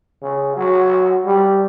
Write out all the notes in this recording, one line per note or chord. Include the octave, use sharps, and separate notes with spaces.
C#3
F#3
G3